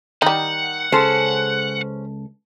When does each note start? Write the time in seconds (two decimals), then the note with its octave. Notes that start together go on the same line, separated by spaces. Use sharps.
0.22 D#3 G3 D#4 F#5
0.92 C#2 C#4 G#4 A4 C5